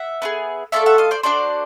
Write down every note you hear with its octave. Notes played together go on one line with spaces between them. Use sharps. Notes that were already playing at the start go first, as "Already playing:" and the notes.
Already playing: E5 F#5
B3 E4 G#4
A3 D4 F4 A4 D5 E5
E5 F#5
D#5 F5
C5 D5
D4 F#4 A4 C5 D5